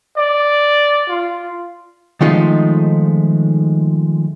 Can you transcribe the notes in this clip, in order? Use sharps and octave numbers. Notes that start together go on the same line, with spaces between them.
D5
F4
D#3 F3 G#3 A3 D#4 F4